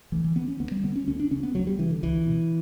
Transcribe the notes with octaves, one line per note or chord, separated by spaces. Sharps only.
D2 E3
E3
D3 B3
C#4
D2 B3
G3
D3 B3
C#4
D2 C#4
D4
C#3 C#4
B3
D2 F#3
G3
C#3 E3
D3
C#2 E3
B2